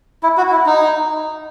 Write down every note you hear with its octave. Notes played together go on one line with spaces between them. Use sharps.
E4
F#4
E4
D#4